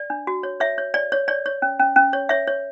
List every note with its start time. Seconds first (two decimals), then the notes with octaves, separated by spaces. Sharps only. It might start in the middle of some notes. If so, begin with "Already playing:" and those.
Already playing: D5
0.10 D4
0.27 F#4
0.43 C#5
0.60 C#5 E5
0.78 C#5
0.94 C#5 D5
1.12 C#5
1.28 C#5 D5
1.46 C#5
1.62 C#4
1.80 C#4
1.96 C#4
2.13 C#5
2.29 C#5 E5
2.47 C#5